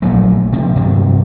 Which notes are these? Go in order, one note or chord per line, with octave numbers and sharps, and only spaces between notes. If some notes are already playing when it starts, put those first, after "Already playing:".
A#1 A#2 F#3 A3
C3 F3
G2 C3 D#3 F#3